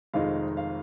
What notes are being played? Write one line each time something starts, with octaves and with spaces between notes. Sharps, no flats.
F1 F2 D#3 G#3 D#4 F5
F5